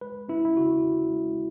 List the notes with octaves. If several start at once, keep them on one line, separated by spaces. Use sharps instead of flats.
G#3 B4
C#4 E4
E4
C#3 F#4
C#3
G#3